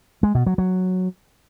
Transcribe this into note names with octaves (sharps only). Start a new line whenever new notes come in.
G#3
B2
F#3
F#3